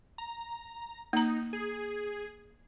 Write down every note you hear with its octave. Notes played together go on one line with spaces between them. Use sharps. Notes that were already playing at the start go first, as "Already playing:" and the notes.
A#5
A#3 D#4 A#5
G#4